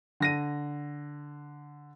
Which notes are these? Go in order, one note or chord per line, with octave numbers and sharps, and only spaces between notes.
D3 A#6 D#7